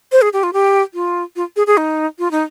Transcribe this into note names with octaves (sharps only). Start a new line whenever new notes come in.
C5
G#4
G4
F4
G4
F4
F4
G#4
G#4
D#4
F4
D#4